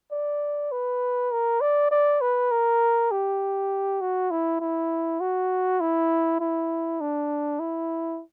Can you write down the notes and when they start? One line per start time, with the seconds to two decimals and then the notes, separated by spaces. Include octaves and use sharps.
0.12 D5
0.72 B4
1.32 A#4
1.61 D5
1.91 D5
2.21 B4
2.51 A#4
3.11 G4
4.01 F#4
4.31 E4
4.61 E4
5.21 F#4
5.80 E4
6.40 E4
7.01 D4
7.60 E4